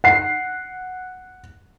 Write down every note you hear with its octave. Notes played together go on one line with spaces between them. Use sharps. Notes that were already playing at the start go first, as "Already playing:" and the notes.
F#5 C7